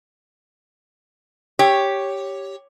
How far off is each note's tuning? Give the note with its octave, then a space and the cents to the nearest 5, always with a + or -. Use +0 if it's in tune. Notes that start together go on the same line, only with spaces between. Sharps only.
G4 +0 C#5 +0